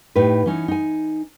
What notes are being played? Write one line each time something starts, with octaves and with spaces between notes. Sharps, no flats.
A2 D#4 G4 B4
E3 C#4 D#4
D#4 G#5